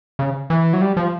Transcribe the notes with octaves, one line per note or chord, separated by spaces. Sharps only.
C#3
E3
F#3
G3
F3